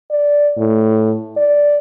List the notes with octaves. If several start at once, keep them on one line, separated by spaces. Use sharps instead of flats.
D5
A2
D5